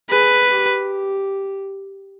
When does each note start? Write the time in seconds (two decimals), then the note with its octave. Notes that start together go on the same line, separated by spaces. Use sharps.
0.09 G#4 B4
0.48 G4